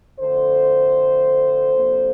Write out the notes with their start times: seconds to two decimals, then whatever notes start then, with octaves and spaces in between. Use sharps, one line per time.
0.19 F2 D3 A3 A4 C5
1.75 C3 F3 A#3 D4